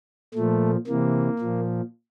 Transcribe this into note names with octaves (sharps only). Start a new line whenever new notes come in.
A#2 F3 A3
C3 E3 A#3
A#2 F3